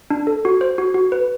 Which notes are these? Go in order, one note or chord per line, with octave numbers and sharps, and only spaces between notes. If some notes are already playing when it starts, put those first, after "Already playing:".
D4
A4
F#4
C5
F#4
F#4
B4